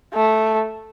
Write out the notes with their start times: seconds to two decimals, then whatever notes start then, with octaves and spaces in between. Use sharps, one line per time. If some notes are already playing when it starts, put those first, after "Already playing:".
0.14 A3